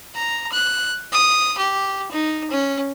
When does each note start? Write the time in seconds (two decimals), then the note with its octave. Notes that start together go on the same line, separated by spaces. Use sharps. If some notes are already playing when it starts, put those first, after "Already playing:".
0.15 A#5
0.52 F#6
1.12 D#6
1.58 G4
2.12 D#4
2.51 C#4